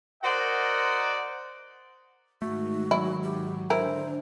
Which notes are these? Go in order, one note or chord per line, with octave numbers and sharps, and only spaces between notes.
F#4 A#4 C5 D5 D#5 F#5
G#2 D#3 A3 F#4
F#3 E4
G4
D3 D4 E4 A#4 C5